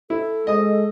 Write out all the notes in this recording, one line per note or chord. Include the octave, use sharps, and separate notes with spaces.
E4 A4
G#3 D#5 D#6